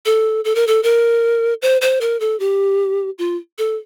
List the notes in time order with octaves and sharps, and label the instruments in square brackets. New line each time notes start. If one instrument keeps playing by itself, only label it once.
[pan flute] A4
A4
A#4
A4
A#4
C5
C5
A#4
A4
G4
F4
A4